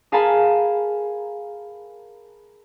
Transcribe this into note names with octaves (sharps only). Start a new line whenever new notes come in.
G#4 A#4 F5 G#5 A5 B5